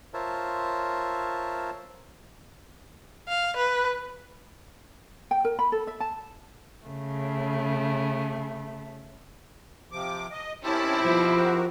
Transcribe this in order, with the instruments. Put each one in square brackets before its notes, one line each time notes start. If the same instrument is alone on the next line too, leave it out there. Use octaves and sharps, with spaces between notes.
[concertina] F4 A#4 C5 C#5 E5 A5
[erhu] F5
B4
[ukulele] G5
A#4
B5
A4
E5
A5
[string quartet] C#3 A3
[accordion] C3 F3 D6
D#5
[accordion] D#3 C#4 A5 [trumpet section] C4 G4 [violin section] E4
[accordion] B2 [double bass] F3
[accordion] F#4 A#4